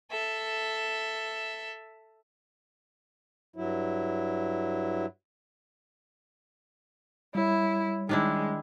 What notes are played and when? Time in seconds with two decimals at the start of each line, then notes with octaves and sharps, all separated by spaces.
0.11 A4 E5
3.56 G2 F#3 E4
7.35 G3 E4 C#5
8.09 D#3 G#3 D4 E4